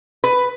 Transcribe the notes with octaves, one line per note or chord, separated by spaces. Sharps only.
B4